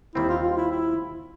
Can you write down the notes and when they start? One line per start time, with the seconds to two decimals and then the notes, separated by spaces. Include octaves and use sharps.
0.15 D#2 D#3 G3 C4 E4
0.29 F4
0.43 F4
0.57 E4
0.71 E4